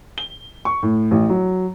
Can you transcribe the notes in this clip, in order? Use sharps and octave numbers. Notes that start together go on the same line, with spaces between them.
G7
C#6
A2
A1
F#3